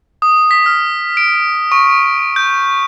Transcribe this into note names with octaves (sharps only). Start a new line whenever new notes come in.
D#6
B6
F6
D7
C#6
G6